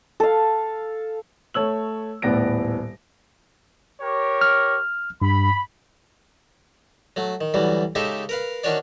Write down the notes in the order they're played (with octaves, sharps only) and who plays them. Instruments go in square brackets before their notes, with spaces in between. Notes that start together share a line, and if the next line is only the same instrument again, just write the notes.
[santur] A4 F5
[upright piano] A3 C#5 E6 F#7
D#1 A2 B3 D5 A#6 D7
[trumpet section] G4 A#4 C#5
[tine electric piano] F6
[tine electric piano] G2 [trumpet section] B5
[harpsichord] F#3 A3
D#3
D2 E3 F#3 G3
C#3 G#3 D#4 G4 A4 E5
A#4 B4 F5
D#3 C#4 D4 F#4 C#5 D5